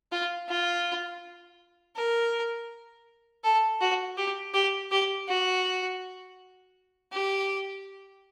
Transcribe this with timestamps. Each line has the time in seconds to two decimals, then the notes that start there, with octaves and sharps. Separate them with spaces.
0.12 F4
0.49 F4
1.96 A#4
3.44 A4
3.81 F#4
4.17 G4
4.54 G4
4.91 G4
5.28 F#4
7.12 G4